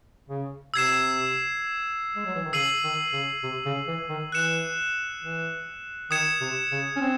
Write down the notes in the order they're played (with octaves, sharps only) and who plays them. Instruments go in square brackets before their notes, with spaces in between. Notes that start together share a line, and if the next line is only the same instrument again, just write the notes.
[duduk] C#3
[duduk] C3 [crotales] E6 G#6 C7 E7
[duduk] G#3
F#3
E3
D#3
[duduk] C#3 [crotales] E6 C7 D#7 F#7
[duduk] D#3
C#3
C3
C#3
E3
D#3
[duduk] E3 [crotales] F#6 C#7 E7
[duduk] E3
[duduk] D#3 [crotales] D#6 G#6 C#7 E7
[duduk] C3
C#3
C#4
C4